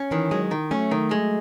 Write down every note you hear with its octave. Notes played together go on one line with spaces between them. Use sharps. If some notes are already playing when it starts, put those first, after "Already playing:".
Already playing: C#4
D#3 E3
F#3 G#3
D#3
F#3 A3 C#4
D#3
G#3